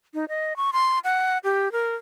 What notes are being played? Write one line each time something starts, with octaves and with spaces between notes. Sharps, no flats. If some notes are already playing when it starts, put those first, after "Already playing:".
D#4
D#5
C#6
C6
F#5
G4
A#4